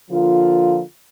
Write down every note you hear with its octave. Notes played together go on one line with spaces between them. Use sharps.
D3 F3 A#3 F4